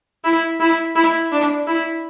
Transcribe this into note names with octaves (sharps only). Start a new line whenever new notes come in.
E4
E4
E4
D4
E4